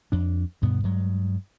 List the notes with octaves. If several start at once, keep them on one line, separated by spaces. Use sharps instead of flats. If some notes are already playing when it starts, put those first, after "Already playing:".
F2 D4
D2 G2 B2 B3
G2 F#3 G#3